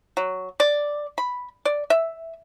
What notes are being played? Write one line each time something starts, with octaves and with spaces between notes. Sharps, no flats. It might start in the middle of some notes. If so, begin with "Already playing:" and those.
F#3
D5
B5
D5
E5